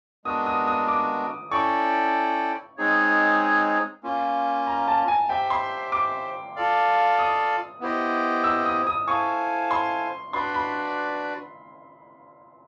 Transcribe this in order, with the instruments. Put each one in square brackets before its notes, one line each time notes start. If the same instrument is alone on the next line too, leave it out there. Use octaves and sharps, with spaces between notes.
[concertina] G#3 B3 D4 F#4 A#4 [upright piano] D#6
[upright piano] D#6
D#6
D6
[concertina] C#4 E4 A4 D5 G5 [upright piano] C#6
[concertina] G#3 C4 D#4 G#4 C#5
A#3 C#4 F4
[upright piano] A#5
A5
G#5
[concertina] G4 C5 E5 [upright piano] G5
[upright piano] C6
D6
[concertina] F4 A4 D5 F5
[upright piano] D#6
[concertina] B3 E4 G4 C5 D#5
[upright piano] E6
D#6
D#6
[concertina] E4 A4 C5 F5 G#5 [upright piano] C#6
[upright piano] C6
[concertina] D4 F#4 B4 D5 [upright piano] C6
[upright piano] B5